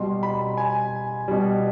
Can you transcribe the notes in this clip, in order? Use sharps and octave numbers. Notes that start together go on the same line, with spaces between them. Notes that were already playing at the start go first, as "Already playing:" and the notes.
Already playing: B2 G3 C6
B5
G#5
B2 G3